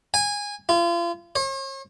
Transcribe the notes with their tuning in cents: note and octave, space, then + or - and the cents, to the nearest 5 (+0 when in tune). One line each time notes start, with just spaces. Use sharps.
G#5 -20
F4 -35
C#5 -45